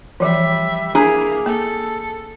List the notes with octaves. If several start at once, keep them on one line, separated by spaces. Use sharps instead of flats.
E3 F3 G3 E5
A#3 D4 E4 G#4 A#5
A#3 A4